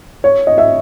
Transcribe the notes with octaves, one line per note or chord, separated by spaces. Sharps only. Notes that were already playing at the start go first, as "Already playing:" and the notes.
C#5
D#5
E5